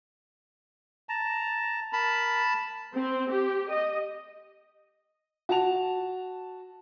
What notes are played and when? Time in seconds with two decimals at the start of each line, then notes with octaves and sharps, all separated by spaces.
1.09 A5 A#5
1.93 A#4 A5 B5
2.94 C4
3.31 G4
3.70 D#5
5.49 F#4 A5 F7